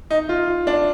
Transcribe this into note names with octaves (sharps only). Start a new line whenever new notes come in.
D#4
F4
D4